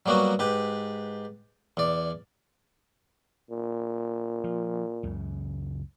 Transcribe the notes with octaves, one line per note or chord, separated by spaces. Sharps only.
F#3 G3 A#3 B3 F#4
G#2 G4 B4
E2 D5
A#2
F3
C#2 F#2 C#3